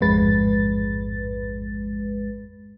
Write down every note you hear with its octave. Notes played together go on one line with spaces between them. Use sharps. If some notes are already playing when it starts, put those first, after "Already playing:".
A1 F2 G#2 G#3 B4 A6